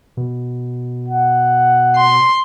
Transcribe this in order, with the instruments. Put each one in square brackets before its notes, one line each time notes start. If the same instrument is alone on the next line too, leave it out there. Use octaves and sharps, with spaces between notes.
[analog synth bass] B2
[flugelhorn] F#5
[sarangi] C6